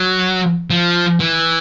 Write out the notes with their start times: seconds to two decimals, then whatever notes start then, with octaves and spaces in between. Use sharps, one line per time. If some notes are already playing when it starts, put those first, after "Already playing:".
Already playing: F#3
0.70 F3
1.20 E3